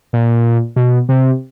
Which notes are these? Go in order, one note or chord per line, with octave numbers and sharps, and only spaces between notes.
A#2
B2
C3